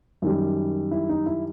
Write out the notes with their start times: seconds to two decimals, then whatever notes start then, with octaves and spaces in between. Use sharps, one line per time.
0.22 F#2 D#3 G3
0.91 E4
1.09 D#4
1.26 E4